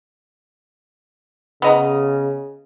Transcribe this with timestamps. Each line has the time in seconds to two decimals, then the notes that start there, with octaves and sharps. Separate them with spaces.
1.62 C#3 B3 D#5 A#5